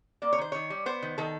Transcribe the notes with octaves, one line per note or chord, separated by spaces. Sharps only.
A#3 D5
C#5
D#3 C5
D#3 C#5
G3
B3 C5
D#3
D#3 A4